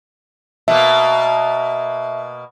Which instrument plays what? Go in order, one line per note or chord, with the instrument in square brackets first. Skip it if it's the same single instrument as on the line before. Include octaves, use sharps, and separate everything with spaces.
[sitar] B2 A#3 [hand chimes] E5